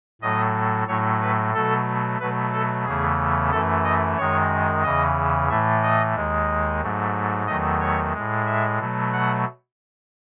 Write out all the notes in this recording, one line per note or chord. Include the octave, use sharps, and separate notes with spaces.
A2 F#3 A3 D#5
A2 F#3 A3 C#5
B4
B2 F#3 A3 A4
B2 F#3 A3 B4
A4
E2 C#3 E3 A3 G#4
F#2 E3 A3 A4
D#5
F#2 D#3 G#3 C#5
E2 C#3 E3 D#5
A2 E3 A3 E5
D#5
D#2 D#3 G#3
G#2 F#3 A3
E2 D#3 F#3 A3 D#5
C#5
A2 G#3
E5
B2 F#3 A3
F#5